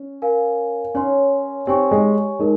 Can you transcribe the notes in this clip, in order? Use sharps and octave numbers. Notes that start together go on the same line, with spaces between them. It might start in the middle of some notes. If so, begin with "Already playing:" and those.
Already playing: C#4
A#4 F5 G#5
C#4 C#5 G#5 C6
C4 G4 C#5 G#5 C#6
G#3
G#3 D#4 A#4